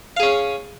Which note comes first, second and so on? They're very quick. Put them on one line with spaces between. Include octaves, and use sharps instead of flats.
F5 G#4 C#4